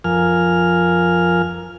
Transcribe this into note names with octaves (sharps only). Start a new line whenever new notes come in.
F2 F3 A#4 G#5 F6